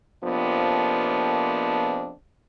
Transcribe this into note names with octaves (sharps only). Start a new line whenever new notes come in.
F2 C3 F3 A#3 B3 D4